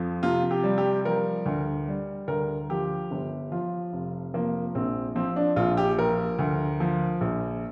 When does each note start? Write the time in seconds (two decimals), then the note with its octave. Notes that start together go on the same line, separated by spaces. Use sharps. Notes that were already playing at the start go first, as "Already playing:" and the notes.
Already playing: F2 F3
0.23 C3 F4
0.51 G4
0.64 G3
0.78 G4
1.05 F3 A#4
1.46 D2
1.88 G3
2.28 D2 A#4
2.70 F3 G4
3.11 G1
3.52 F3 F4
3.93 F1
4.34 F3 A#3
4.75 A#1 C4
5.15 F3 C4
5.36 D4
5.56 A#1 F4
5.77 G4
5.98 F3 A#4
6.39 D2
6.80 F3
7.21 A#1